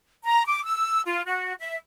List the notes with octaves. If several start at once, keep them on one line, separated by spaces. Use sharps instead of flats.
A#5
D6
E6
F4
F#4
E5